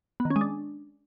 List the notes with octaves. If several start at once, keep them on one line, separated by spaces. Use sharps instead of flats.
B3
D#3
C#4
G#3
D4